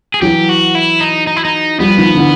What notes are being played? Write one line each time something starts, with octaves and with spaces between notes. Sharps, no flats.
G#4
E3 F#3 G4
F#4
E4
D#4
D#4
E4
D#4
F3 G3 B3
D#3 F3
D3 E3